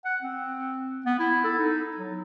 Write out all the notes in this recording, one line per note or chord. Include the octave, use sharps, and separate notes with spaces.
F#5
C4
B3
E4
A4
D#4
F#3